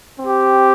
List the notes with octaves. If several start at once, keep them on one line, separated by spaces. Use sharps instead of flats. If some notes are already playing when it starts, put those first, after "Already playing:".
C4 G4